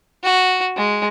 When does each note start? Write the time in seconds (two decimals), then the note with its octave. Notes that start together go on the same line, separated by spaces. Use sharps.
0.23 F#4
0.77 G#3